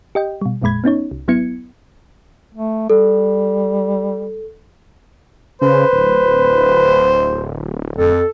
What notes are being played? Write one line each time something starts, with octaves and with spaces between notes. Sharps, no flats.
G4 D#5 G5
B2 G3
A1 F2 A#2 G#3 B5 G#6
B3 C#4 D#4 C#5
C2
G#1 F#3 B3 E4 G#6 C#7
A3
G3 A4
C#3 B4 C5
D1
F2 A4